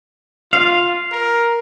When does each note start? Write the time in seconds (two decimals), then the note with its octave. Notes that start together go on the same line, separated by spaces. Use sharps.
0.53 F4 F5
1.12 A#4